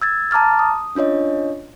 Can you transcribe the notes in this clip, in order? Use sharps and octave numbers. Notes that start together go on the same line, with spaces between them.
E6 G#6 A6
A5 A#5 D6 F6 A6
D#6
C#4 D4 F4 C#5 D#5